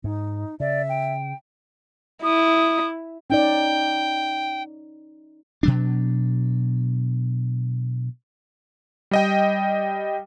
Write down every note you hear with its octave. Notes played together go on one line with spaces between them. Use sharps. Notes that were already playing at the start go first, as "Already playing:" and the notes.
G#2 D#4
C#3 D5 E5
G5
E4 D#6
C#4 D#4 D5 G5
B2 F#3 D4
G3 D#5 G5